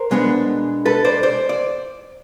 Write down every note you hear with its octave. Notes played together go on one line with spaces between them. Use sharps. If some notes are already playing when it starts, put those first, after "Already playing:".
Already playing: A#4 C5
B2 G#3 B3 D4
A4 B4
C5 D5
C5 D5
D5